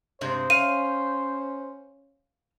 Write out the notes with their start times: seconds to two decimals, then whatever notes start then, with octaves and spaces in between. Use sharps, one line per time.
0.21 G2 C3 G#3 C5
0.50 C#4 F5 D#7